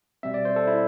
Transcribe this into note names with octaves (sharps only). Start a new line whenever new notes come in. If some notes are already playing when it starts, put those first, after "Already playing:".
B2 G3 C4 E5
D5
C5
A4
E4